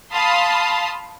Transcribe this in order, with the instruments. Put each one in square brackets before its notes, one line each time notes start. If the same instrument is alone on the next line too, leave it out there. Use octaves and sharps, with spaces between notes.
[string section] F5 A5 B5 C6 D#6